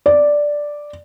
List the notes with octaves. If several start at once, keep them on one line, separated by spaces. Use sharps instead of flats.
D5